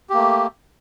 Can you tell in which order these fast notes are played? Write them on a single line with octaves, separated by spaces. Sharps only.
G4 A#3 A3